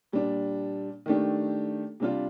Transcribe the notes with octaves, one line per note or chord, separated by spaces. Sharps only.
A#2 G3 D4
D#3 A3 D4 G4
C3 G3 D4 F4